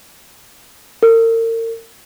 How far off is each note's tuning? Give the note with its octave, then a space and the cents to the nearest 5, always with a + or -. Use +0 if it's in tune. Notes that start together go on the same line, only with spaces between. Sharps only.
A#4 -40